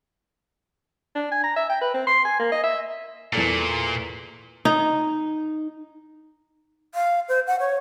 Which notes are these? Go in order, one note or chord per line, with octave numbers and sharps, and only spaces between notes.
D4
G#5
A#5
E5
G5
B4
C4
C6
G#5
A#3
D#5
E5
E2 A#2 A4 A6
D#4
F5
C5
F#5
C#5